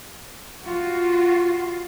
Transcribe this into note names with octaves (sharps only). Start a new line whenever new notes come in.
F4 F#4